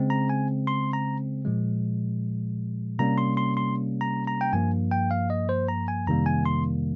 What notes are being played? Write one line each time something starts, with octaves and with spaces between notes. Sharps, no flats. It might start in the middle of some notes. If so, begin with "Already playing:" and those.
Already playing: C#3 G#3 C4
A#5
G#5
C6
A#5
A#2 F3 G#3
C3 G3 A#3 C#4 A#5
C6
C6
C6
A#5
A#5
G5
G2 F3 A#3 G#5
G5
F5
D#5
C5
A#5
G#5
F2 C3 D#3 G3 A#3 A#5
G#5
C6